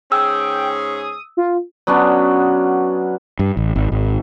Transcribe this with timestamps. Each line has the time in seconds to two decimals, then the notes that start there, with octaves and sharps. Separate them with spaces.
0.12 G#2 C#4 G#4 G5 E6
0.94 D#6
1.37 F4
1.87 F#3 B3 C#4 D4
3.39 G2
3.57 A1
3.76 G#1
3.92 G#1